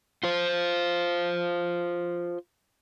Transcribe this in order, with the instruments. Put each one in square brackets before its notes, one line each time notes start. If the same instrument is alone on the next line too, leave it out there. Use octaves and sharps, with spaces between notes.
[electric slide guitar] F4 C5